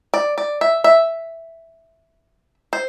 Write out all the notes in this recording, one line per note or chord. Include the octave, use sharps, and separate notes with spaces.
D5
D5
E5
E5
C5